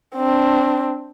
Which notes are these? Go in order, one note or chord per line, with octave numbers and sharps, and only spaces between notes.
C4 D4